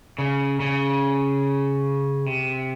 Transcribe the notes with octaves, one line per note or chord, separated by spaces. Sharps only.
C#3
C#3
C3